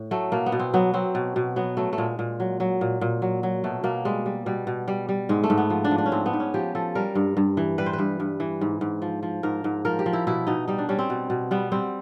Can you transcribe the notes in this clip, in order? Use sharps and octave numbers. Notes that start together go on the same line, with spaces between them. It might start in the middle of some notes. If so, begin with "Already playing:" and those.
Already playing: A2
F#3 A3
B2 A#3
B3
B2
C4
F#3 B3
F#3 C4
B2
B2
F#3 B3
F#3 A3
A3
A#2 G#3
A#2
F#3
F#3
A#2
A#2
F#3
F#3
B2 A3
B2 A#3
G3 G#3
G3
B2 G3
B2
G3
G3
G#2 G#3
A3
G#2
B3
F3
D4
F3
D4
C#4
G#2 C4
B3
G#2
C#4
F3 G4
F3 A4
G3 A#4
G2
G2
E3
G3 B4
C5
B4
G2
G2
E3
G#2
G#2
F3
F3
G#2 A#4
G#2
F3 A#4
G4
F3
E4
B2 E4
B2 D#4
G3 D#4
D4
G3 C#4
C4
B2
B2
G3 B3
G3 C4